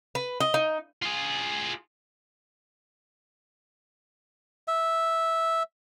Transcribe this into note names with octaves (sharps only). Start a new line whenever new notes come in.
B4
D#5
D#4
F4 G#4
E5